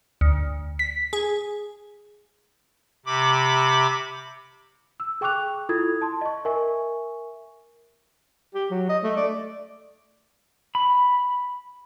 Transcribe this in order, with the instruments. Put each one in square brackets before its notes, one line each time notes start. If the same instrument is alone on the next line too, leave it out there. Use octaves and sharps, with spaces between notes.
[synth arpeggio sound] D2
B6
G#4
[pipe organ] C3 B5 D6
[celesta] E6
G#4 G5 C#6 D6 F#6 F7
E4 F4 A4 D#6 G#6
A5 C6
D#5 C#6
A#4 E5 G#5 C#6
[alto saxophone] G4
F#3
D#5
A3
D5
[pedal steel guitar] B5